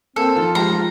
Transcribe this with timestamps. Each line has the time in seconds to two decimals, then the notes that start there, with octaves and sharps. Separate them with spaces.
0.16 A#3 C4 A4
0.35 F2 D#3 F4 A5
0.55 F3 G#3 G4 A#5